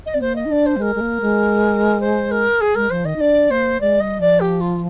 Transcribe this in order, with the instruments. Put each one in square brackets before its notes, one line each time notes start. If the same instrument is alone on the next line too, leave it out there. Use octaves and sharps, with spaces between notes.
[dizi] D#5
[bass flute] C4 [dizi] D5
[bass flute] A#3 [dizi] C5
[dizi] D#5
[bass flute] D#4
[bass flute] D4 [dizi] D5
[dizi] C5
[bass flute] G3
[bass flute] G#3 [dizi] A#4
[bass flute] G#3
A#3
G#3
[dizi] C5
A#4
G#4
[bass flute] G#3 [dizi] A#4
[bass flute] F3 [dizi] C5
[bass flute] D#3 [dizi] D#5
[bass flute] D#4
[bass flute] D4 [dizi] D5
[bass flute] A#3 [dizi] C5
[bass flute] G#3 [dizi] D5
[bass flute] G3 [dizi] D#5
[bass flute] F3 [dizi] D5
[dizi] G4
F4